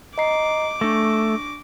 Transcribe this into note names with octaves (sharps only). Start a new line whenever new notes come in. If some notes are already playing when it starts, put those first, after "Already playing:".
D#5 A#5 D6 C7
A3 D4 C#6 A#6